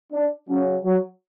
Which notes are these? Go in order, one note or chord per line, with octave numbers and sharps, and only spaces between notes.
D4
C#3 F#3 C#4
F#3